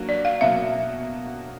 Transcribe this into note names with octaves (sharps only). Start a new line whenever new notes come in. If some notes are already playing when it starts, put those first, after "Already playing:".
Already playing: F#3 A#3 D4 F#4
D5
F5
B2 F#3 A#3 E5